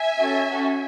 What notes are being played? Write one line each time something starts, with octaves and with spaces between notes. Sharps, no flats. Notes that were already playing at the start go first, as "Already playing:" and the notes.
Already playing: E5 G#5
C#4 F#4 A4
C#4 F#4 A4